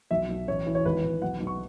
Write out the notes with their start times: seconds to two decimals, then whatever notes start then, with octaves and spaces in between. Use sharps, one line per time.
0.11 B1 E5
0.29 B1
0.47 A1 C#5
0.67 E3
0.75 C#5
0.85 G#1 B4
1.04 G#1
1.22 B1 F#5
1.41 B1
1.47 C#6